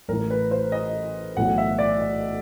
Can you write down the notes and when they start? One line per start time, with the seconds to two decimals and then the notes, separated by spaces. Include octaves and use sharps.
0.08 A1 A2 E3 A#4
0.30 B4
0.51 C5
0.72 D#5
1.37 B1 A2 E3 F#5
1.58 E5
1.79 D5
2.01 D#5